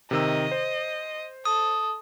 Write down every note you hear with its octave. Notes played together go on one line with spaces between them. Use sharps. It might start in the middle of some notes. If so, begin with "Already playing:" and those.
C3 D#3 D#5 E6
C5
A4 D#6